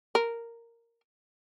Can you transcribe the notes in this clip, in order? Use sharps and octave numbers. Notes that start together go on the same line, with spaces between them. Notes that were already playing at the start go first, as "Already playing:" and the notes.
A#4